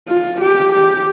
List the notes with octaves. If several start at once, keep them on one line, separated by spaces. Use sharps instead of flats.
F4
G4
G4